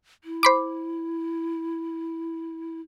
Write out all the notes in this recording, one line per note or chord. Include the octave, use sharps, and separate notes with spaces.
E4
C5 B5 D6